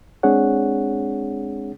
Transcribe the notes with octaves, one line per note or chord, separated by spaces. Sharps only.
G#3 C4 D4 G#4 C#5 F#5